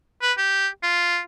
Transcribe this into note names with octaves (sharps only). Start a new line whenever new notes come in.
B4
G4
F4